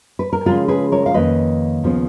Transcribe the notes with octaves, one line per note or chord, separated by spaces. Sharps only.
B4
A#4
C#3 F3 G#3 C#4 F4 G#4
G#4 B4
A#4 C#5
F5
F2 D#3 A#3 C#4 B4 D#5
D#2 C#3 F3 B3